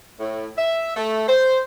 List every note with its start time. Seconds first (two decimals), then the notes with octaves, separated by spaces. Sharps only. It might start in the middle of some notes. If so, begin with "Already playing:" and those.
0.20 A2
0.57 E5
0.96 A3
1.28 C5